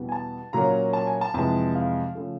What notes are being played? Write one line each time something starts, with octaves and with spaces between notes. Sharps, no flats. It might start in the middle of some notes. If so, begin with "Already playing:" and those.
Already playing: E2 B2 G3 B3
G#5
A5
A#2 F#3 A#3 C#4 A#5
A5
G#5
A5
F2 C3 E3 G#3 A5
F5
C#3 F3 A3